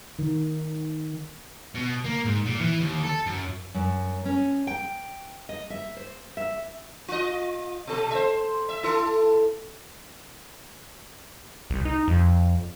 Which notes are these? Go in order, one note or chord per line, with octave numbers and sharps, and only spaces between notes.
D#3
B2
A#3
G#2
A#2
E3
D#2
A4
F#2
F#2
C#4
G5
D#5
E5
C5
E5
F4 D#5
B2 A4
C5 E5
E5
E4 A4
C2
D#4
F2